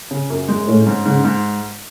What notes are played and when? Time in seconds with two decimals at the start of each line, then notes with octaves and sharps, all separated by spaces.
0.11 C#3
0.30 F#2
0.49 G#3
0.68 A2 C#4
0.86 G#2
1.06 G#2 C#3
1.24 G#2